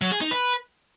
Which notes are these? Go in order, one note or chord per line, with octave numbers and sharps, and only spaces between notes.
F#3
G#4
D#4
B4